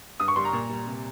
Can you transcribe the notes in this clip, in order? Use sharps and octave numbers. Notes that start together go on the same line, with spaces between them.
G2 D#6
C#6
G3 C6
A#5
A#2
G3
C3